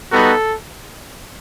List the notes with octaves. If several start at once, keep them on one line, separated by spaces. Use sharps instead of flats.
G3 B3 D#4 F#4 A4